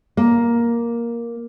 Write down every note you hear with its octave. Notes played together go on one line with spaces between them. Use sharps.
A#3